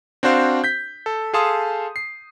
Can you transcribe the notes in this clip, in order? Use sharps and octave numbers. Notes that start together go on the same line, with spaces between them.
C4 D4 F#4 C5 F5
G6 B6
A4
G#4 A4 F5 A5 C6 D#6
C7